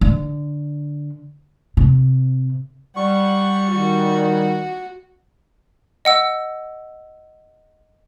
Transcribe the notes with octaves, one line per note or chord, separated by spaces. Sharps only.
D3
C3
G3 F#5 C#6
D#3 F#4
D#5 F#5 E6